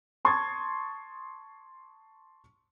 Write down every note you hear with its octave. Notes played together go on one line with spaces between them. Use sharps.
A5 C6 C#6 D#6 G#6 A6